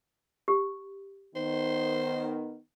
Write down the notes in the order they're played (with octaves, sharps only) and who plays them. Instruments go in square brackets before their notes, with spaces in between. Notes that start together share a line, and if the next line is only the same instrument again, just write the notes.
[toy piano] G4
[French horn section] D#3 B3 [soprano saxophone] C5